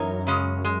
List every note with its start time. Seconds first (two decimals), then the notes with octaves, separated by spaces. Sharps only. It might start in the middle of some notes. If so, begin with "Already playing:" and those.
Already playing: F#2 E3 D#4 A#4 C#5
0.27 C#3 G#3 C#4
0.64 G#3